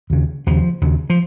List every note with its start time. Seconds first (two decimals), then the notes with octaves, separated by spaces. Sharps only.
0.10 D#2 C#3
0.47 D#2 C#3 F3
0.81 D#2 C#3
1.10 F3